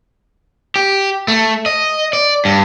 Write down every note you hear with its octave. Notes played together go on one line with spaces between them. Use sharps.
G4
A3
D#5
D5
G2